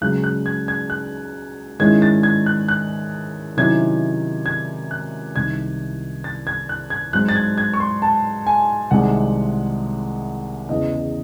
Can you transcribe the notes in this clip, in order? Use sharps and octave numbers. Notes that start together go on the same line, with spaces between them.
C#2 C#3 F#3 F#6
F#6
G#6
G#6
F#6
G#2 D#3 G#3 C#4 E4 G#6
A6
G#6
F#6
F#6
C3 D#3 F#3 C#4 E4 G#6
G#6
F#6
C2 C3 D#3 G#6
A6
G#6
F#6
G#6
G#2 F#3 C4 F#6
A6
G#6
G#6
C#6
C6
A5
G#5
C2 C3 D#3 G#3 C4 F#5
E2 C#3 E3 D#5